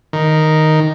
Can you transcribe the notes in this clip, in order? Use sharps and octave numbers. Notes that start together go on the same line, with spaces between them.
D#3